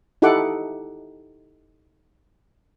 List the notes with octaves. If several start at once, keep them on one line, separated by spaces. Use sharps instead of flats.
D#4 E4 G4 A4 F#5 D6